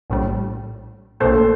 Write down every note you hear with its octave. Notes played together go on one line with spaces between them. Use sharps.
A#1 A2 G3
A#1 A#2 A3 A4 C5